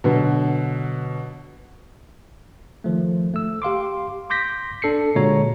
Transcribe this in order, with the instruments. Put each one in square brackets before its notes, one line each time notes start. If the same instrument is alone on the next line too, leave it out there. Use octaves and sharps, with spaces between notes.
[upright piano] B2 D3 F#3
[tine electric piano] D#3 F3 A3
A3 E6
G4 F5 C6 D6
C6 D6 G6 A#6 B6
D4 A4 C7 C#7
A#2 D3 G#3 F#4 C#5 A#5